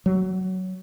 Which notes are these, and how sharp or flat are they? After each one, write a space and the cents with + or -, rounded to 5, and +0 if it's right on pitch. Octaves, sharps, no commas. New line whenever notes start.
F#3 +10